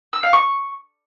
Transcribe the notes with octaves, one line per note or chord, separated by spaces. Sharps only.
E6
F5
C#6